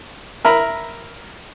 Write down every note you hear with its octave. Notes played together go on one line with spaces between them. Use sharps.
A#4 E5 B5